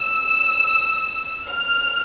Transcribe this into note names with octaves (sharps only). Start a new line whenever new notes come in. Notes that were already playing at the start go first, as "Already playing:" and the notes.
Already playing: E6
F6